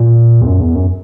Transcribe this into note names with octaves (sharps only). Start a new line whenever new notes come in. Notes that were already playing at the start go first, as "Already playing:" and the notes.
Already playing: A#2
E2
F#2
E2
F#2